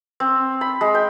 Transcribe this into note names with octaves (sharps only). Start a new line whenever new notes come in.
C4
B5
G#3
G5